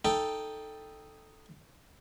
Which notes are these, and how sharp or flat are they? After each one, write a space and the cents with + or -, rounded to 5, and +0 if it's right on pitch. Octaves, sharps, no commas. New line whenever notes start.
D#4 +0 A4 +0 G5 +5